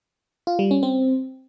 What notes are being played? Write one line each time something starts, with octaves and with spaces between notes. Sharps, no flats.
F4
G3
C#4
C4